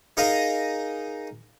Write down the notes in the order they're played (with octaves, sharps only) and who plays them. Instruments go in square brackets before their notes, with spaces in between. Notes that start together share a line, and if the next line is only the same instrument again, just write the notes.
[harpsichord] D#4 G#4 A#4 D#5 F5